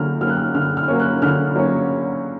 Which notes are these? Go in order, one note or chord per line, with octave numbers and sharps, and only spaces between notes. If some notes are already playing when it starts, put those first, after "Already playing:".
Already playing: D3 F#3 A#3 C#4 F6
F#3 A#3 C#4 F6
F#6
F6
D3 F6
F6
F#3 A#3 C#4
F#6
D3 F6
F#3 A#3 C#4